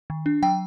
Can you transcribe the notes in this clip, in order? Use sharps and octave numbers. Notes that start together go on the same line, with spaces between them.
D#3
D4
F#3 G5